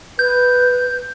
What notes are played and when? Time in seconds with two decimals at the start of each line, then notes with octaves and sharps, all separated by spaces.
0.19 B4 G6